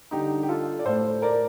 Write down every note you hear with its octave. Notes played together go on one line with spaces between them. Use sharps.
D3 G3 D#4 G4
G4
F4 A4
D5
A2 A3 A4 C5
A#4 D5